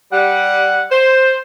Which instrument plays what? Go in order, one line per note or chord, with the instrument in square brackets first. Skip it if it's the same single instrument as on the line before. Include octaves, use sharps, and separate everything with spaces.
[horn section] G3 F#5
C5